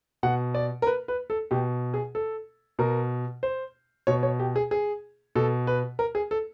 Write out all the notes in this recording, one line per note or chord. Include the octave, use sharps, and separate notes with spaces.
B2 F#5
D5
A#4
B4
B4
A4
B2 G4
G#4
A4
B2 A#4
C5
B2 C#5
C#5
G4
G#4
G#4
B2 A4
B4
A#4
G#4
A4